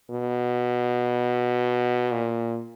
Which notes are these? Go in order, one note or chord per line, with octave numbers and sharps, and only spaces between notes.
B2
A#2